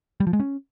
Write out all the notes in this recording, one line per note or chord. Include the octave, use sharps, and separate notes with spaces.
G3
F3
G#3
C#4